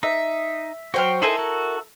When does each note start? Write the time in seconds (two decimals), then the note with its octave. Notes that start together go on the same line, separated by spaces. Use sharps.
0.03 D#4 E5
0.94 F#3 F#4 C5 G5 F6
1.22 D#4 E4 A4 A#4 C5 G#5
1.39 F#4